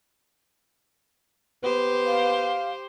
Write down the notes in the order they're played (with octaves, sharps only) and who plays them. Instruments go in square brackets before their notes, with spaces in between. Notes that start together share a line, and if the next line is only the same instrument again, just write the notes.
[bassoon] B3 [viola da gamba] G4 C5
[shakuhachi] F5